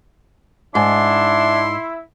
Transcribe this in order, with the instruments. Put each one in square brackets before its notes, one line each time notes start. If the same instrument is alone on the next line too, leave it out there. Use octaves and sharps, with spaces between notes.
[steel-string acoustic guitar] G#2 [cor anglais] D4 [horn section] E4 [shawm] C6